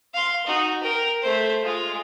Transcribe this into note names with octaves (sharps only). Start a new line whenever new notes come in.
F5 C6
D#4 F#4
A#4 G5
A3 C5
G#3 F4